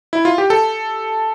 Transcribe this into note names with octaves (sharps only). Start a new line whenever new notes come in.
E4
F4
G4
A4